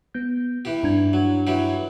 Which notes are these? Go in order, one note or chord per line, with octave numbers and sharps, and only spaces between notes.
B3 G6
E3 G4
G2 D4 G#6
F#3
E3 F#3 G4